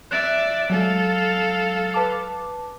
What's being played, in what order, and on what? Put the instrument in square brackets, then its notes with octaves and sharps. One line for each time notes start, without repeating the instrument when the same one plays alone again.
[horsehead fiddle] D5 E5 [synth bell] F#6 E7
[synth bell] F#3 G#3 [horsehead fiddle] A4 F5
[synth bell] B4 A5 D6